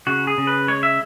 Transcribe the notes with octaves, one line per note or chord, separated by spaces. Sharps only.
C#3 F#4
G#4
C#3
B4
G#3 C#5
E5